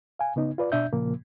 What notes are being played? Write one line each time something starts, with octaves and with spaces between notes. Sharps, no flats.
F5 G#5
C#3 B3 D#4
F4 B4 D5
B2 D4 E5 G6
A#2 C#3 F3 A#3